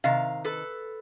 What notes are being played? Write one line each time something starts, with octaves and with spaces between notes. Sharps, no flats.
C3 D#3 F5
A4 B4